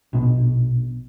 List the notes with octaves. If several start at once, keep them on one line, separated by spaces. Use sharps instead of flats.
A#1 B2